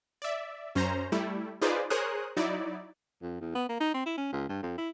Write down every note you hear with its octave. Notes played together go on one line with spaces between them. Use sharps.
D5 E5
F#2 C#4 C5 A#5
G3 A3 E4
D#4 F4 G#4 B4 C5 D5
G#4 A#4 C5 C#5 D#6 F#6
F#3 D#4 E4 D5
F2
E2
B3
A#3
D#4
C4
E4
C#4
C#2
G2
F2
E4